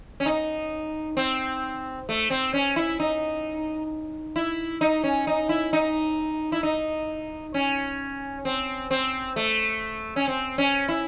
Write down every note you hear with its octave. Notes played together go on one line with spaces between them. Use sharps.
C#4
D#4
C4
A3
C4
C#4
E4
D#4
E4
D#4
C#4
D#4
E4
D#4
E4
D#4
C#4
C4
C4
A3
C#4
C4
C#4
E4